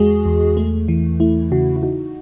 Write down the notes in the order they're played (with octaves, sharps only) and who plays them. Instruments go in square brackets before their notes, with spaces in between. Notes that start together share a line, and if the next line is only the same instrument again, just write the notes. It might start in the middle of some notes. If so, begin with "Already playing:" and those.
Already playing: [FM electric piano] E2 G#3 F#4 G#4
E2
A3
E3
A3 E4
C#3 F#4
E4
D#4 F#4